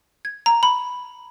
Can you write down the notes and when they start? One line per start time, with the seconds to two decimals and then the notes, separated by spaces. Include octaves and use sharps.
0.25 G#6
0.46 A#5
0.63 B5